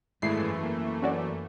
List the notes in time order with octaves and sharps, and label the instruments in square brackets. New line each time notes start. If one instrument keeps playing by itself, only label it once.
[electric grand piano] G#1 G#3 E4 [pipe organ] F#2 [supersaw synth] E3 A3 [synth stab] C7
[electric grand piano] A#3
[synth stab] C#4 F#4 D5